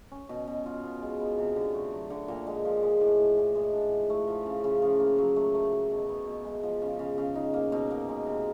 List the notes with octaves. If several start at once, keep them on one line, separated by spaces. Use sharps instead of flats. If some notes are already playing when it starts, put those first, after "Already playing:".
C#4
B2
B2
F4
B3
G#3
B3
C3
D3
A3
F#3
D3
A#2
G#3
F3
G#3
A2
A2
E3
G#3
D4
F3
A3
F3
C#3
C#3
F3
A#3
F#3
A3
A3
F#3
B2
B3
B2
G#3
F3
C#3
C#3
C#3
D#4
A#3
B2
A#3
G#3
C3